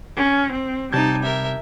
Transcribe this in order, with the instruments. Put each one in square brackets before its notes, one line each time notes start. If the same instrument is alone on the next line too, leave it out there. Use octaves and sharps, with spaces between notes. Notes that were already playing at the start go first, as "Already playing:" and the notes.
[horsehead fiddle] C#4
C4
[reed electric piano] C3 G6 G#6 [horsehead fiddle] G3 [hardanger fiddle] D#4 A5
[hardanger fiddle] A#4 E5